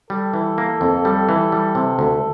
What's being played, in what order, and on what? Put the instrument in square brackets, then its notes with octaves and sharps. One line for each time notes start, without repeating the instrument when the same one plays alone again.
[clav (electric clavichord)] G3 [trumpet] A4
[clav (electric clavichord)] E3
A#3
F2
G3
E3
G3
C3
D2